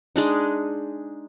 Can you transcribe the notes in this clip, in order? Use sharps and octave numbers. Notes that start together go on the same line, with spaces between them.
G#3 D4 D#4